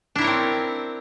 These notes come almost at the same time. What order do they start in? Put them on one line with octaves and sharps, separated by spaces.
D4 E4 A#4 C#5 C4